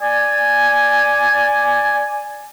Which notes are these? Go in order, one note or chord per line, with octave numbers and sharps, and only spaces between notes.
D5 G#5